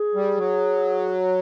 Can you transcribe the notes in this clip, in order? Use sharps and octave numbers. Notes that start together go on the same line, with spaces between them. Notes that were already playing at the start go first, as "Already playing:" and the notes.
Already playing: G#4
G3
F#3